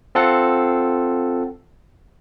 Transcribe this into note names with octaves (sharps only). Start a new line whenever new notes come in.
C4 F4 A4 F#5